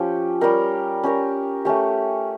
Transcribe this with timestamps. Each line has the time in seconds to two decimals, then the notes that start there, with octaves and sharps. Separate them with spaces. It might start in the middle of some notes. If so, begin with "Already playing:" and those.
Already playing: F3 C#4 G4 C#5
0.41 G3 C#4 G4 A#4
1.03 C#4 G4 A#4
1.65 A3 C#4 G4